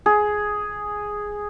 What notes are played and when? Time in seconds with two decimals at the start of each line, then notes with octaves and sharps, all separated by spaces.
0.06 G#4